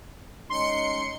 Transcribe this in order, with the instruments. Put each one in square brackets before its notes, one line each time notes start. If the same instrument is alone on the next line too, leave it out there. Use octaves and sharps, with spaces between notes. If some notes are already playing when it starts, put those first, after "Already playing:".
[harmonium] G#3 C#4 D#4 [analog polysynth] C6 C#7